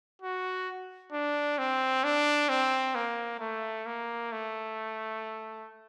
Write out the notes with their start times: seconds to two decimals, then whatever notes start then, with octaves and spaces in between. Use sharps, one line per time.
0.22 F#4
1.12 D4
1.58 C4
2.04 D4
2.49 C4
2.95 A#3
3.40 A3
3.86 A#3
4.32 A3